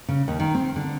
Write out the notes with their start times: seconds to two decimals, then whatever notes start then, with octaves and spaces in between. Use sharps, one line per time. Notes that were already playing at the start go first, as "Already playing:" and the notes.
0.08 C#3
0.28 D#2
0.40 D#3
0.55 C4
0.76 D3